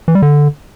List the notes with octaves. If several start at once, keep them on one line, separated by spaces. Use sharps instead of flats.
E3
G3
D3